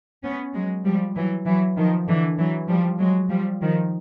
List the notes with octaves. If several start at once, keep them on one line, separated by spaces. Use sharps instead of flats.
B3 C#4
F#3 G#3
F3 G3
E3 F#3
E3 F#3
D#3 F3
D3 E3
E3 F#3
F3 G3
F#3 G#3
F3 G3
D#3 F3